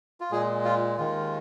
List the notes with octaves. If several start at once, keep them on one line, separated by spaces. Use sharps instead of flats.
F4
A#2 G#3 G#4
F4
D#2 D#3 G#3 F4